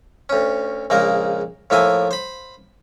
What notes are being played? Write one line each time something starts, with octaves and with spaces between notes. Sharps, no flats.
D2 C#4
A#1 C#3 G#3 A#3 A#4
A2 F3 A#3 E5 G#5
C5 B5